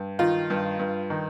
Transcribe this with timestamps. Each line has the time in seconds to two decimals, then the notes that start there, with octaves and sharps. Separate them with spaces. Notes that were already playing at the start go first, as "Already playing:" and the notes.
Already playing: G2
0.19 D#3 F4
0.50 G2
0.79 G2
1.10 D#3